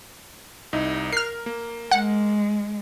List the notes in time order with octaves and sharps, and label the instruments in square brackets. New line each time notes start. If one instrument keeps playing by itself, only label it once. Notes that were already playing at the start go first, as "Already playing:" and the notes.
[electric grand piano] C2 D#4 E4
[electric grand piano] A#4 [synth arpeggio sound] F6 C7
[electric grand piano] A#3
[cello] G#3 [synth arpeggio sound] F#5